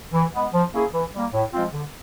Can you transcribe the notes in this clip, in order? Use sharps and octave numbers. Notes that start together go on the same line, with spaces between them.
E3
G#3 B3
F3
A#3 C#4 E4 G#4
E3
G3 A#3
A2
F3 G#3 C4 F4
D3